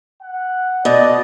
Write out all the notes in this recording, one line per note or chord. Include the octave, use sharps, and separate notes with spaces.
F#5
B2 D5 D#5